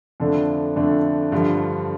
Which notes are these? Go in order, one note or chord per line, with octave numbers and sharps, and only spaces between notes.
F2 D3 A3 D4
F2 D3 A3 D4
G2 D3 F3